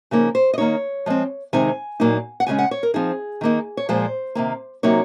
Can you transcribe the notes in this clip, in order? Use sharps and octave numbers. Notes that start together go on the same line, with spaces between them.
C#3 F3 A#3 D#4
C5
D#5
D#3 A#3 D#4 C#5
F3 G#3 C4
C3 D#3 G#3 C4 D#4 G#5
A#2 F#3 A#3 D#4
F#5
C#3 F3 G#3 C#4 G#5
F#5
C#5
A#4
F3 C4 D#4 G#4
D#3 A#3 D#4
C#5
A#2 F3 G#3 C5
C3 D#3 A#3
C3 F#3 A#3 D#4 C#5